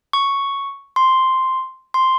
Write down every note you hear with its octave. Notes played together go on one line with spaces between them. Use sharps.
C#6
C6
C6